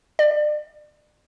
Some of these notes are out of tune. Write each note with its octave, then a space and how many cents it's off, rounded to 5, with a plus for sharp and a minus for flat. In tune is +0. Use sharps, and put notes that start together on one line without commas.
D5 +40